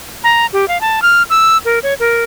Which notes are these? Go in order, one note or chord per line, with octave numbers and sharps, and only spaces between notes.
A#5
G4
F5
A5
F6
E6
A#4
C#5
A#4